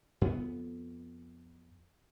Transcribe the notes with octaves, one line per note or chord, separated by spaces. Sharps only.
F2 B3